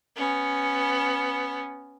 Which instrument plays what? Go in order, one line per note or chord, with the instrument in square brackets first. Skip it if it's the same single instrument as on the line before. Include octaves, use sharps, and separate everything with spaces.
[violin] B3 C#4